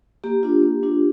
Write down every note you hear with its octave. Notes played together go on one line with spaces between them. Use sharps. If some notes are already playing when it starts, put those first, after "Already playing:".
A#3 G4
D4 F4
A#3
D4 F4